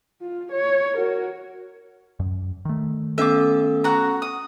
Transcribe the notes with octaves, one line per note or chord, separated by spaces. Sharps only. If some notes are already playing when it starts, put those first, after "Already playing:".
F4
C#5
F#4 A#4
F#2
D#3 A3
B3 C#4 A4 E5 D6
F#4 F#5 A#5
D#6